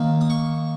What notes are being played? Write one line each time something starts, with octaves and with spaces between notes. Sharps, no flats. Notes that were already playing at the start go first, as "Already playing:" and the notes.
Already playing: D#3 A#3 D#4
D#6
C#6